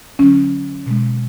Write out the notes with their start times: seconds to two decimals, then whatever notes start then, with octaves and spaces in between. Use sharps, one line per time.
0.19 D3 F#3 C#4
0.86 B2 G#3